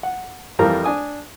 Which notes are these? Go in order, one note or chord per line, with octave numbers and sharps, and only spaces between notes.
F#5
F2 E3 F3 G3 A#4 A#5
D4 G#5 D#6